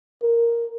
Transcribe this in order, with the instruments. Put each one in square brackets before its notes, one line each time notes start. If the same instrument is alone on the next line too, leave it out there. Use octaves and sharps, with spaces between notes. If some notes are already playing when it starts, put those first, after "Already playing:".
[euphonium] A#4